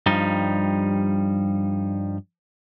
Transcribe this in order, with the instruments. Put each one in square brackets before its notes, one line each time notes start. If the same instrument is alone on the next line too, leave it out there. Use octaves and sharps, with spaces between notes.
[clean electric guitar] G2 F3 G3 D#4